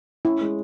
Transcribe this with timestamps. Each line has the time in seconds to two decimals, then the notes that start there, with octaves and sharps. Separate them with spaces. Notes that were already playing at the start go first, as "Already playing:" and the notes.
0.25 C#4 E4
0.41 G#3